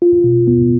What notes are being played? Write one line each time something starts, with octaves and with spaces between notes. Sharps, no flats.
F4
B2
B3